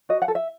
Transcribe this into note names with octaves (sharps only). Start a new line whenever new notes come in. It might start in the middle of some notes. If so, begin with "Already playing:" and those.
F#4 D#5
F#5
A4
E5